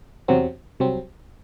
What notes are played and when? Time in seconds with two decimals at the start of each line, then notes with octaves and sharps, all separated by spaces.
0.28 E2 C3 F#3 C4
0.80 C2 C3 F#3 C4